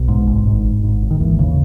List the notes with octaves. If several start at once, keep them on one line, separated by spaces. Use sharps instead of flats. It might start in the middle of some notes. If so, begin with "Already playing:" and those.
Already playing: B1
G#2
G#1
G#2
G#1
G#2
G#1
D#3
D#2 E3
C#3